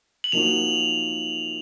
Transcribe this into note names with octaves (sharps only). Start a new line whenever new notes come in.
F#7
F3 A#3 D#4 F#4 F7